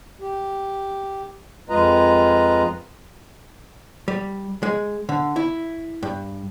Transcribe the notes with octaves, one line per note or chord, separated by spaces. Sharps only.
G4
F2 G#3 F4 B4 D#5 A#5
G3
G#3
D3
E4
G2